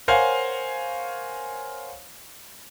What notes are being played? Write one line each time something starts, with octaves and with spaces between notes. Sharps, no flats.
A#4 C5 C#5 F5 F#5 G#5